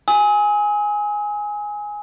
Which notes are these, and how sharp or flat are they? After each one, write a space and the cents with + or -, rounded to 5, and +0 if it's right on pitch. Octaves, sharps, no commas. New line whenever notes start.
G#5 +0 D#6 +45